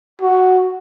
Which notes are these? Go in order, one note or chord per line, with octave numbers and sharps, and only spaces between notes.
F#4